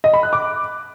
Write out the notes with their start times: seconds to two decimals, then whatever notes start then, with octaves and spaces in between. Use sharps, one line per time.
0.04 D#5
0.14 B5
0.23 F#6
0.33 D6